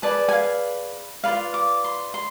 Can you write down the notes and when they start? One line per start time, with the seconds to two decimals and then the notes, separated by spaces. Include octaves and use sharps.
0.02 G#4 B4 D5 A5
0.29 G#5
0.33 F5
1.24 F4 B4 D5 F5
1.54 D6
1.84 C6
2.14 C6